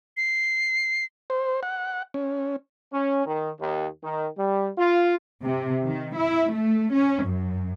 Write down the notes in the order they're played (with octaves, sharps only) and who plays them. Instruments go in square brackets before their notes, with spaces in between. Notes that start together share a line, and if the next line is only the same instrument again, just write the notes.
[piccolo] C7
[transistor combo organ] C5
F#5
C#4
[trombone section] C#4
D#3
D#2
D#3
G3
F4
[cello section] C3
D#3
E4
A3
C#4
F#2